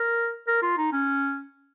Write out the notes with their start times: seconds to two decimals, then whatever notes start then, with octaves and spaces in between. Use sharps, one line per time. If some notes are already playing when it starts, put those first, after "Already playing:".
Already playing: A#4
0.48 A#4
0.62 F4
0.77 D#4
0.93 C#4